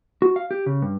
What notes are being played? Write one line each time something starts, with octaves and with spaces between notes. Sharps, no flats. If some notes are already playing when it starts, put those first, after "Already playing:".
F#4
F5
G4
C#3
G2